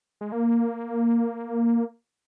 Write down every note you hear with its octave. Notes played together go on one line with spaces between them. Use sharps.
G#3
A#3